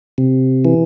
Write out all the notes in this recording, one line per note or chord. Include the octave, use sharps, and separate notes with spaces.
C3
E3